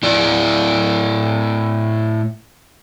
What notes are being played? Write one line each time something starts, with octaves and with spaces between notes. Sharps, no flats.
A2 E4 D5